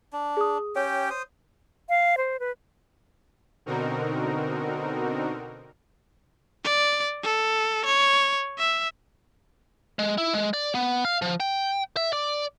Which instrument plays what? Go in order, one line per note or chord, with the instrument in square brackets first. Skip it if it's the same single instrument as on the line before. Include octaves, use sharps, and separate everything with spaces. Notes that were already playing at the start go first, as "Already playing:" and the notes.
[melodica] D4
[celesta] G#4 D#6
[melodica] C#4 G4 G5 [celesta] C#5
[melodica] C5 D#6
[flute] F5
C5
B4
[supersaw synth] B2 D3 C4 D#4 F#4 A#4
[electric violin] D5
A4
C#5
E5
[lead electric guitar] G#3
E4
G#3
D5
B3
F5
F3
G5
E5
D5